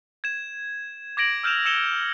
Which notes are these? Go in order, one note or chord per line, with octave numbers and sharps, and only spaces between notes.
G#6 E7
D6 G#6 A#6 D7 F#7
E6 F6 G6 D7 E7 F7
E6 C#7 E7 G7